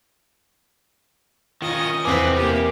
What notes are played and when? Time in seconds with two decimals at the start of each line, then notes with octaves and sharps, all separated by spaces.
1.62 D#3 C#4 F4 D#5
2.05 E2 C3 C4 B4 G#5 D6
2.36 A#3 G4